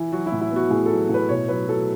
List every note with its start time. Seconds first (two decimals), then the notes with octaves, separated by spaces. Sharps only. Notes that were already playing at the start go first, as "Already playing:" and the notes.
Already playing: E3
0.12 F#3 F#4
0.26 E4
0.32 A2
0.41 E4
0.51 B3
0.56 F#4
0.70 A2 G#4
0.86 A4
0.91 F#3
1.09 A2 B4
1.29 B2 C#5
1.48 F#3 B4
1.68 F#3 A4